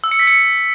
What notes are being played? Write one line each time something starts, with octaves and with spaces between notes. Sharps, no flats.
E6
C#7
B6
C#7